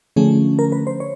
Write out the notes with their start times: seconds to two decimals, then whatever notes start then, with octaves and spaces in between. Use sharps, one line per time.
0.16 D3 F3 A3 C#4 G#4
0.59 A#4
0.72 B4
0.87 C5
1.00 C#5